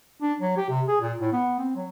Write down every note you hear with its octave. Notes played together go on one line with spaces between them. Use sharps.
D4
F#3
G4
C3
G#4
A#2
A2
B3
C4
F#3